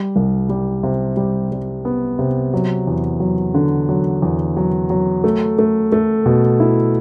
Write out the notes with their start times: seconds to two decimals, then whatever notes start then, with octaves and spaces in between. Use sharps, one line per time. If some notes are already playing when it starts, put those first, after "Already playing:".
Already playing: G3
0.16 C2
0.49 G3
0.83 C3
1.17 G3
1.52 G3
1.85 B3
2.19 C3
2.54 F#3
2.87 E2
3.20 F#3
3.54 D3
3.89 F#3
4.22 E2
4.57 F#3
4.90 F#3
5.24 A3
5.59 A3
5.92 A3
6.26 B2
6.60 E4